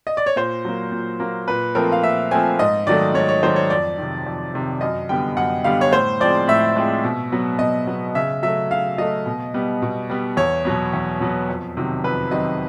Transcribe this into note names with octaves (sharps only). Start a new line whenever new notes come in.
D#5
D5
C#5
A#2 C5
F#3 A#3
A#2
F#3 A#3
A#2 B4
F3 A3 C4 A#4
F5
A#2 E5
F3 A3 C4 G#5
G#2 D#5
D#3 F#3 A3 D5
G#2 C#5
C#5
D#3 F#3 A3 C5
C#5
F2 D5
C3 D#3
F2
C3 D#3
F#2 D#5
D3 G3 B3 G5
F#2 F#5
D3 G3 B3 F5
C#5
A2 C5
F3 G#3 C4 D5
A2 E5
F3 G#3 C4
B2
F#3 B3
B2 D#5
F#3 B3
C#3 E5
F#3 A3 E5
C#3 F5
F#3 A3 D#5
B2
G3 B3
B2
G3 B3
E2 C#5
B2 F#3 B3
E2
B2 F#3 B3
F2
C3 D#3 F#3
F2 B4
C3 D#3 F#3 D#5